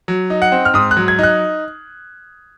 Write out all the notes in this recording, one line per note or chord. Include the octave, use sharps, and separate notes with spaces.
F#3
D#4
F#5
C4
F6
G#2 D#6
F#6
F#3
G#6
D#4 F#6